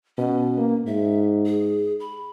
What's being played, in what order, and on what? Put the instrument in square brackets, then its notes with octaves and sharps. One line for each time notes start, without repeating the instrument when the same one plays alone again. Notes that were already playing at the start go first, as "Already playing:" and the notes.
[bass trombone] B2 [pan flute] C#4
[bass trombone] A#3
[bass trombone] G#2 [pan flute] E5
[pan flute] G#4
B5